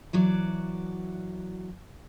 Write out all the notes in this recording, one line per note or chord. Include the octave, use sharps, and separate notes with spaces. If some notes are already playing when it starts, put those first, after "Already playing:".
E3 F#3 F#4 D5